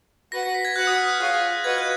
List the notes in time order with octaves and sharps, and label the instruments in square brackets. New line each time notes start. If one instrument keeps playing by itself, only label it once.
[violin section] F#4 B4 F#5 [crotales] A#6
[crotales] A#6
B6
G#6
[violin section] F#4 B4 F#5 [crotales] F#6
[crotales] D#6
F6
F6
[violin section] F4 G#4 C#5 F5 G#5 [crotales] F#6
[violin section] F#4 B4 D#5 F#5 [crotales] G#6
[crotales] F#6